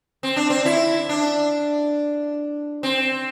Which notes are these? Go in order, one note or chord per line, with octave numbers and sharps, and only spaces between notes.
C4
D4
C4
E4
D4
C4